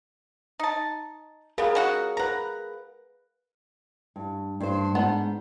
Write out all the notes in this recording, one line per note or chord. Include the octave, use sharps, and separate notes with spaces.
D#4 A5
C#3 B3 G#4 A#4 F5
C#4 F#4 F#5
A#4 B4 F#5 A#5
G2
G2 C5
G#2 B3 D4 G5